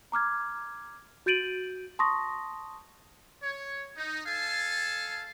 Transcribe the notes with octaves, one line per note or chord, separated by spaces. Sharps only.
A#5 D6 F6 G#6
F#4 G6 A6 D7 D#7 F#7
A5 C6 C#6 D#6 A#6
C#5
D#4
A4 F5 G#5 A5